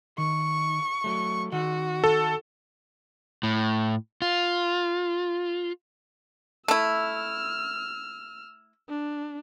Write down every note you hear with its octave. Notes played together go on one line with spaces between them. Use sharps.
D#3 C#6
F#3 A3
D#3 F#4 F#5
A4
A2
F4
A3 E4 E6 F6
D4